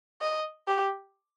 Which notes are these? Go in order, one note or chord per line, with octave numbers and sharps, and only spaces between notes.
D#5
G4